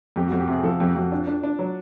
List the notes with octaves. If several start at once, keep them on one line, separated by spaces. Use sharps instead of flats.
F2 G4
F2 F#4
G4
C3 G#4
F3 A4
F2 G4
F2 F#4
D4 F4
D4
D4
F#3